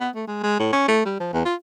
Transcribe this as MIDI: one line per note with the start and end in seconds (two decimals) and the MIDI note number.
0.01 0.10 59
0.15 0.27 57
0.27 0.39 56
0.43 0.58 56
0.60 0.69 45
0.73 0.87 61
0.88 1.05 57
1.06 1.20 55
1.20 1.31 53
1.33 1.45 40
1.45 1.55 65